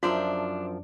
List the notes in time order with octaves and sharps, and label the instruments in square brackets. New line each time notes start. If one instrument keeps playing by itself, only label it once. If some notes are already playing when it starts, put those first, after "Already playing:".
[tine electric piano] F#2 F3 [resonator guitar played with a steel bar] D4 [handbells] F4 [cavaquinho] A#4 C5 E5